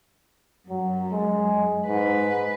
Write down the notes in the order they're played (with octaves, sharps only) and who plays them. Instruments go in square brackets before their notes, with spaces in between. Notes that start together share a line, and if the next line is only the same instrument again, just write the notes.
[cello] F#2 [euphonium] F#3
[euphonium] G#3
[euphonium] G#2 [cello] B4